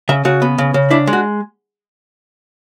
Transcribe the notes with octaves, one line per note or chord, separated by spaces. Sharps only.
C#3 E5
C#3 F#4
B3
C#3
C#3
D4 E4
G#3
F#4